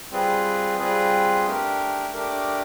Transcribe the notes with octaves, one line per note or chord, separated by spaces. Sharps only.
G3 C4 F4 G#4 B4
G3 C4 F4 G#4 B4
A3 D4 G4 A#4
A3 D4 G4 A#4